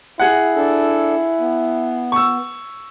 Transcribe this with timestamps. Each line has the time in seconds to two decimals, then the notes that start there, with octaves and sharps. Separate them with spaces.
0.20 E4 G#4 F#5
0.56 D4 A4
1.40 B3
2.12 C#6 E6